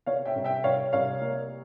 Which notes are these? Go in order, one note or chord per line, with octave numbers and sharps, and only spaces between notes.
C3 C#5 F5
E5 G5
C2
E5 G5
C2 C#5 F5
C2 C#5 F5
A#3